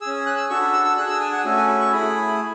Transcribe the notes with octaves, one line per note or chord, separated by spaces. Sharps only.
G#4 E6
C#4
F#6
E6
D4 F#4 A4 C#6
B5
E6
E6
D4 G#4 F#6
E6
G#5
F#5
A3 C#4 F#4 A4 G#5
G#5
B5
C#6
A3 E4 G#4 B5